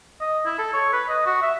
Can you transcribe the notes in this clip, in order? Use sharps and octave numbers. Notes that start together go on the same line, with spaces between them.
D#5
E4
A4
C#5
B4
D#5
F#4
E5